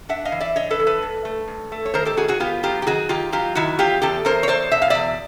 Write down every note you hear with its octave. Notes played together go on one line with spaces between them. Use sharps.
D4 E5 F#5
D#5 F5
E3
D5 E5
D4 C#5 D#5
A4 B4
E3
A4 B4
G2
A3
G2
A3
C#5
D#3 A#4 C5
G4 A4
D#3 F#4 G#4
F#4 G#4
B3 F4 G4
F#3 F4 G4
G4
D#3 F#4 G#4
D#3 F4 G4
F#3 F4 G4
D#3 E4 F#4
E2 F4 G4
E2 G4 A4
E2 A#4 C5
C#5
E2 C5 D5
B2 E5
F5
E2 D5 E5